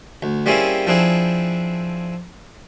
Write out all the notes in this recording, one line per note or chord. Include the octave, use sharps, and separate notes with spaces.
D2
G3 A#3 C4 C#4 E4 G#4
F3 C4 D4 E4 G#4